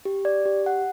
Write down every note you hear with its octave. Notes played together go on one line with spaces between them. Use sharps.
G4
D5
G4
F#5